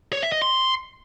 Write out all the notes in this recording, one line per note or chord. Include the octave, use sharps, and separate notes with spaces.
C#5
E5
D#5
C6